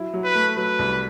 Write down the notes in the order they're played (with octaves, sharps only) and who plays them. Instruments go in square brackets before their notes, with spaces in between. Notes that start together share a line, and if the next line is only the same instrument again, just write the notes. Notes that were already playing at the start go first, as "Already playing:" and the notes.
Already playing: [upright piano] F#3 E4
F#3
[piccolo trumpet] B4
[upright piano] A3
[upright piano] F#3 [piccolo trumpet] B4
[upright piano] C2